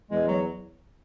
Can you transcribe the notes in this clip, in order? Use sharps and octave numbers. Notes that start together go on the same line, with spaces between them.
E2 G#3
F#3